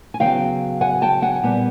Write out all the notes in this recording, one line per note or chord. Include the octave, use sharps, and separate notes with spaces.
G#5
C#3 F#3 B3 F5 G5
F#5 G#5
G5 A5
F#5 G#5
A#2 G3 B3